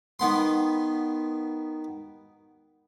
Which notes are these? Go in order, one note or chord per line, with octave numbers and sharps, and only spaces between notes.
D#3 B3 C6